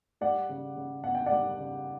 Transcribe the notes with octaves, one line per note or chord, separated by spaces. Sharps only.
G3 D5 F#5
C#3
C#3
B3 F#5
G5
G3 D5 F#5
C#3